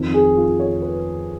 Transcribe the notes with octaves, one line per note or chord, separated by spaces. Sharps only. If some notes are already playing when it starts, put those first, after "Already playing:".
Already playing: F2 D#3
G#4
F4
C#5
B4